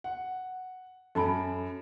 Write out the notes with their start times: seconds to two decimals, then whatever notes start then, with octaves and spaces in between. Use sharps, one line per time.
0.04 F#5
1.15 F#2 A4 A5 B5 D7